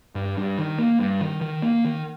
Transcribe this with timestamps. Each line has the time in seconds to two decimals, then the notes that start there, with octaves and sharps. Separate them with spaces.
0.15 G2
0.37 G2
0.58 D#3
0.79 A#3
1.00 G2
1.21 D#3
1.41 D#3
1.62 A#3
1.85 D#3